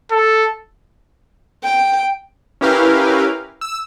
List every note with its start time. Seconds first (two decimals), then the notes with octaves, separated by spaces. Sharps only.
0.12 A4
1.64 G5
2.61 C#4 E4 G4 A#4 B4 F5
3.61 E6